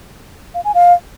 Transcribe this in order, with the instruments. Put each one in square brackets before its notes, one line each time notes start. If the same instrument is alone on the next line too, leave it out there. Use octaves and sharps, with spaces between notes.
[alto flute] F5
G#5
F5